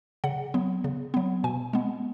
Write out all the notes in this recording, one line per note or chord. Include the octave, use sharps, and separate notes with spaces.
C#3 F#5
F#3 B3
C#3
F#3 B3
B2 G#5
G#3 B3